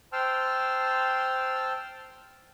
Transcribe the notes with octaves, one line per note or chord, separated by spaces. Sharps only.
C5 G5 A5 C6 E6 F6